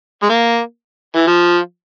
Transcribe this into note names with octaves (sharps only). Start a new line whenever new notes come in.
G#3
A#3
E3
F3